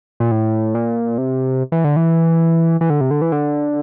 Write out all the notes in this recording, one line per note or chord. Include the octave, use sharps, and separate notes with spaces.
A#2
A2
A#2
C3
E3
D3
E3
E3
D3
C3
D3
E3
D3